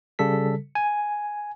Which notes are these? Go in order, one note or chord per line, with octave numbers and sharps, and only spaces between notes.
C#3 G3 A4 B6
G#5